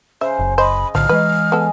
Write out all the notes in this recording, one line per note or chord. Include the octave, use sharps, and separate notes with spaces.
C#3 C5 E5
F#1
C5 D#5 G#5 B5
B1 A2 D3 F3 A#5 F6
E3 G#3 B4 D#5 G#5 C#6
B3 G#4 A4